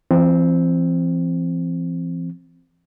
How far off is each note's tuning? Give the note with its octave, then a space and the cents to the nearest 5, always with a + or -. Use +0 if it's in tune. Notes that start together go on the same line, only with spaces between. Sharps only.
E3 +45 C4 +0